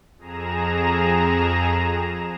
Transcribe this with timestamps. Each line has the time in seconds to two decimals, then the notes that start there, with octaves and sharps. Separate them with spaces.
0.18 F2 G#4 A#5 E7